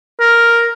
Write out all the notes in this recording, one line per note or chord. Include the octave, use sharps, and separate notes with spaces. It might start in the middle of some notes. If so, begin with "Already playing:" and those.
A#4